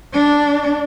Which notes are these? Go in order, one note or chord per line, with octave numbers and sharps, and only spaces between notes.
D4